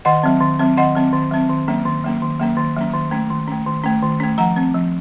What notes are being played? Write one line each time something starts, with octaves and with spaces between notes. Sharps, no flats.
D#3 D#5 F#5
F#3 C4
D#3
F#3 C4
D#3 D#5 F#5
F#3 C4
D#3
F#3 C4
D#3
F#3 A#3 C#4
D#3
F#3 A#3 C#4
D#3
F#3 A#3 C#4
D#3
F#3 A#3 C#4
D#3
A3 C#4
D#3
A3 C#4
D#3
A3 C#4
D#3
A3 C#4
F3 F#5 A#5
C4
F3